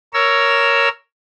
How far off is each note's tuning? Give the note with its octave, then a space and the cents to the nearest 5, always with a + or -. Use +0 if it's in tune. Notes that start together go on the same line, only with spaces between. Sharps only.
A#4 +0 C#5 +10 E6 +15